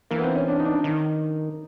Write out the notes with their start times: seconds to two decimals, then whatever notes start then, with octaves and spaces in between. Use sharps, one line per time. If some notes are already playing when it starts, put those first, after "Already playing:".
0.11 E3 A#3
0.19 B3
0.24 C4
0.35 C#4
0.48 D4
0.59 D#4
0.65 D4
0.84 D#3 D#4